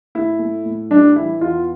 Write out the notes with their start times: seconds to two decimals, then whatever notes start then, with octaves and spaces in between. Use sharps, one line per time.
0.15 A2 E4
0.39 A3
0.66 A2
0.90 G3 D4
1.15 E3 E4
1.41 E2 F4